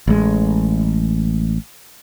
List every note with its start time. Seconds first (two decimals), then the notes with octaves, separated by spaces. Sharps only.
0.08 A1 G#3